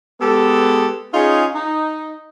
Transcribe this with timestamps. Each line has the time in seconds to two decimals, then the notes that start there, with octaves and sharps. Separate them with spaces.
0.21 G#3 B3 G4 A4
1.14 C#4 D#4 F4 G#4
1.55 D#4